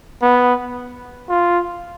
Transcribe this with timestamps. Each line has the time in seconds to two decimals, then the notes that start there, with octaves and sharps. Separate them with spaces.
0.22 B3
1.29 F4